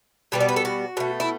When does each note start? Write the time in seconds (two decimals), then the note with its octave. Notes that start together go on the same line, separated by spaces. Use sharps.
0.32 B2 G3 B3 G4
0.40 D5
0.49 B4
0.56 A4
0.65 F#4
0.97 B2 A3
1.20 E4